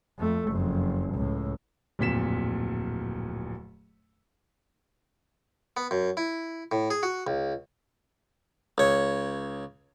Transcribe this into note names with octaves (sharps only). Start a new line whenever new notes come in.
F2 A3
F#1 F2
C#2 A2
D1 F2 A#2 B6 E7
B3
F#2
E4
A2
G#4
F#4
C#2
C#2 C#5